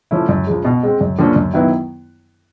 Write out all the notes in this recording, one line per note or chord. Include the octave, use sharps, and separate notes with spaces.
F3 A3 C#4 E4
F#2
C#3 F3 G#3
B2
G#3 C4
F#2
D3 F3 A#3 C#4
F#2
D#3 F#3 B3 E4